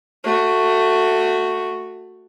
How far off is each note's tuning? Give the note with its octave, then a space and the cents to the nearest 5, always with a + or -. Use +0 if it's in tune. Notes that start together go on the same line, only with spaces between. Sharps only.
A3 +15 F#4 +0